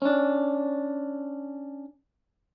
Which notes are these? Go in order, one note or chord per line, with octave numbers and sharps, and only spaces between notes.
C#4 D4